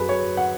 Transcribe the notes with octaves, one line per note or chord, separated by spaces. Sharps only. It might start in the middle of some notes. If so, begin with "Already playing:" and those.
Already playing: F#2 F#3 G#4 B4
C#5
F#5